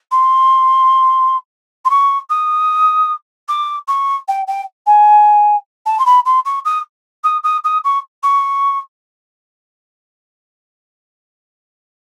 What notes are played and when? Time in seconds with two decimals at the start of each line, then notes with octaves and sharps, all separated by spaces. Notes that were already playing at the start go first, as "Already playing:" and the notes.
0.11 C6
1.85 C6
1.90 C#6
2.30 D#6
3.48 D6
3.88 C#6
4.28 G5
4.47 G5
4.86 G#5
5.86 A5
5.99 C6
6.06 B5
6.25 C6
6.45 C#6
6.65 D#6
7.24 D#6
7.43 D#6
7.64 D#6
7.84 C#6
8.23 C#6